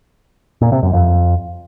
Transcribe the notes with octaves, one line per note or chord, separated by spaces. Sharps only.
A#2
C3
F#2
F2